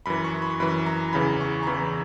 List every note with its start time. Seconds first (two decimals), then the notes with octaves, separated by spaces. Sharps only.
0.06 F#2 E3 B5
0.24 C#6
0.42 B5
0.60 F#2 E3 B5
0.86 A#5
1.13 E2 C#3 E3 B5
1.41 C#6
1.63 A#5
1.67 E2 C#3 E3 B5